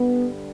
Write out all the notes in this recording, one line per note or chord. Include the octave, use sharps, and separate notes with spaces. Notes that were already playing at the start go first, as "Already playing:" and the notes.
Already playing: G2 D3 G3 B3